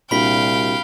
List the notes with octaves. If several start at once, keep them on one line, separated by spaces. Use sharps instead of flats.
C2 A#2 D4 F#4 F5 G5 B5 B6